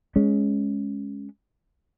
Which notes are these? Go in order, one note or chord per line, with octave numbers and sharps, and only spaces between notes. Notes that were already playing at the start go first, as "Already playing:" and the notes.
G#3 C#4